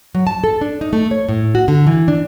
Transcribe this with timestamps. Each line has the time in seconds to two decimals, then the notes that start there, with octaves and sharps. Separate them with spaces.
0.15 F#3
0.27 A5
0.44 A4
0.61 D4
0.81 D#4
0.93 A3
1.11 C#5
1.29 A2
1.55 F#4
1.68 D3
1.87 E3
2.08 D4